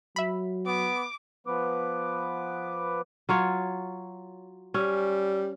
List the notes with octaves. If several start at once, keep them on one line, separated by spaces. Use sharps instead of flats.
F#3 E5 B5
B3 D6
F3 B3 B4 D6
F#3 F4 C#5
G3 C#4